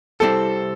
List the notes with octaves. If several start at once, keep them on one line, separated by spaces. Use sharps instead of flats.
C2 C3 G3 C4 E4 A4